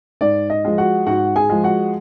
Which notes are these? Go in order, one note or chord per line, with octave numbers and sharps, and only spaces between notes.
G#2 D5
D#5
F3 G#3
F#4 F#5
G#2 F#4 F#5
G#4 G#5
F3 G#3
F#4 F#5